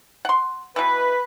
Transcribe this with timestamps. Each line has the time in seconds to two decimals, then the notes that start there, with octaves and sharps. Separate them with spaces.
0.25 F#5 C6
0.76 B2 E3 B4